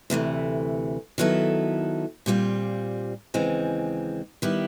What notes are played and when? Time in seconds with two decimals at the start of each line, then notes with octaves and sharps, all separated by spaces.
0.10 D2 C3 E3 A3
1.18 D#3 F#3 B3 E4 A4
2.26 A#2 G3 C4 F4
3.34 D#2 C#3 E3 G#3 C4
4.42 D#3 G3 B3 E4 G4